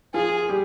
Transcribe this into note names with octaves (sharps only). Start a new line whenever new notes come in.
F3 F4 G#4
G#4
G3 G4